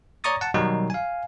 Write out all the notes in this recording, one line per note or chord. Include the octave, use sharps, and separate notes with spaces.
C#5 D5 A#5 C#6 D#6 A6
F#5 A5
B2 D#3 F#3 G3 D#4
F5 G#5